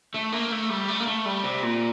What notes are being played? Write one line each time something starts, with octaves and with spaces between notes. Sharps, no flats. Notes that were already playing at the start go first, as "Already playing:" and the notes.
A3
A#3
A3
G3
A3
A#3
A3
G3
C3
A#2